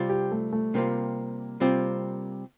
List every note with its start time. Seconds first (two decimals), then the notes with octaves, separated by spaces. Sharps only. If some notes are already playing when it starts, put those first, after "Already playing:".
Already playing: C3 G3 C4 F4
0.10 G4
0.32 A3
0.53 A3
0.74 C3 G3 A#3 C4 F4
1.60 C3 G3 C4 F4